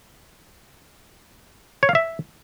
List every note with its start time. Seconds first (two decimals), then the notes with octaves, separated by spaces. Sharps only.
1.83 C#5
1.89 F5
1.95 E5